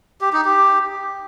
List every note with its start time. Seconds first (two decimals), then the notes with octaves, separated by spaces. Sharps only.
0.21 G4
0.33 D#4
0.45 G4